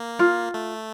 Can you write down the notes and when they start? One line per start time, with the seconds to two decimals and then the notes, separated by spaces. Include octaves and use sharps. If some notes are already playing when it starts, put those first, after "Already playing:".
Already playing: A#3
0.19 F4
0.54 A3